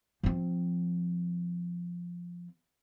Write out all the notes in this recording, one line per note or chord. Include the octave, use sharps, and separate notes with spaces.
F3 C4